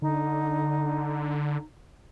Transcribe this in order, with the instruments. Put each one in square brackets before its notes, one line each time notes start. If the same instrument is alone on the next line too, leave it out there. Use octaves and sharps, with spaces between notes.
[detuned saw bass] D3 [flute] D#4